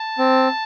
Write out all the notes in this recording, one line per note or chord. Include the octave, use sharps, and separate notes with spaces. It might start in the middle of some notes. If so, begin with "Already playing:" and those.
Already playing: A5
C4